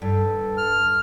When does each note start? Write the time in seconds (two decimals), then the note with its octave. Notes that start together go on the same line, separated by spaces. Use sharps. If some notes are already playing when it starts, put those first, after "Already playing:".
0.02 G2 A4
0.57 F6